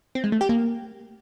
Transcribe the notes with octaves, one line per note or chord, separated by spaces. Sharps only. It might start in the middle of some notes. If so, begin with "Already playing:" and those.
C4
G#3
A3
G4
A#3